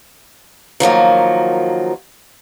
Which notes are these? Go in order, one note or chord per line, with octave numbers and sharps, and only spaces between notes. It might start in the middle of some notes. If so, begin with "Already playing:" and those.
D#3 F3 F#3 A#3